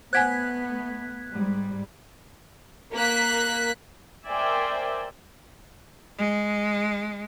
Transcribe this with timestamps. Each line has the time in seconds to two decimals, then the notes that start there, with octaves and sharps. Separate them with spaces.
0.13 A3 B3 C5 F#5 G#5 F#6 G#6 B6
1.32 G#2 G3
2.94 A#3 F#6 B6
4.27 A#4 C5 D5 E5 G5 G#5
6.17 G#3